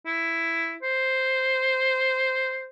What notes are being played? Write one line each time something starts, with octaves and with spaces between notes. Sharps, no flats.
E4
C5